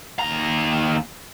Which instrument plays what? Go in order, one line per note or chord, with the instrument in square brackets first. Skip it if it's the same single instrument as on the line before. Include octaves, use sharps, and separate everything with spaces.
[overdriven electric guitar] D#2 A#5